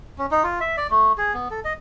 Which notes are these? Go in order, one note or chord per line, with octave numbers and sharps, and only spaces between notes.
C#4
D#4
F4
E5
D5
A3
G#4
B3
A4
D#5